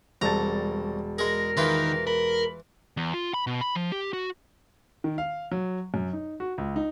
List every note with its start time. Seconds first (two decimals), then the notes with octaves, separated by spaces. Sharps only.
0.21 E1 C2 A5 A#5 A6
1.19 G#3 G#4 A#4
1.57 D#3 E3 F4 B4
2.07 A#4 B5
2.97 E2
3.14 F4
3.34 B5
3.47 B2
3.61 B5
3.75 F3
3.92 G4
4.13 F#4
5.04 D#3
5.18 F5
5.52 F#3
5.94 F#2
6.13 D#4
6.40 F#4
6.58 C#2
6.76 D#4